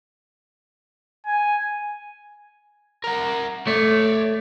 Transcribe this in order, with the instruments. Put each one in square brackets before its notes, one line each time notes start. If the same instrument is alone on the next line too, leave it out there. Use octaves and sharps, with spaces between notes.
[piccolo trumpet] G#5
[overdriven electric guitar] A#4 F#5
[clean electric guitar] A3 [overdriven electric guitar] C#5 D5